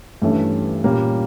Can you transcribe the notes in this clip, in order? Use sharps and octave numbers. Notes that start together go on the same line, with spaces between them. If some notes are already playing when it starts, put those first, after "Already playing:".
G2 E3 A3 C#4
A#2 G3 A#3 C#4